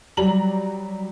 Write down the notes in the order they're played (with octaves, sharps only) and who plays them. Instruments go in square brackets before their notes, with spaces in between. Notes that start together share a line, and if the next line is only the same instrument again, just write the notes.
[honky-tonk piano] F#3 G3 A#5 F#7